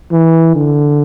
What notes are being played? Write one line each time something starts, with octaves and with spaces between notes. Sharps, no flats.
E3
D3